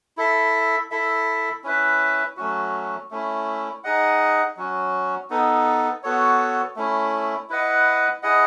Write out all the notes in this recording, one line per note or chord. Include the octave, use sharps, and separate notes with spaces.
E4 A4 E5
E4 A4 E5
C#4 E4 B4 E5
F#3 A3 C#4 F#4
A3 C#4 E4
D#4 G#4 D#5 F#5
F#3 C#4 F#4
B3 D#4 A4
B3 F#4 A4 C#5
A3 C#4 E4
E4 B4 D#5 F#5
E4 G#4 D#5 F#5